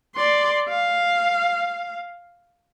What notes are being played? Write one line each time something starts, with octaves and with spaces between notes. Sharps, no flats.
D5 C6
F5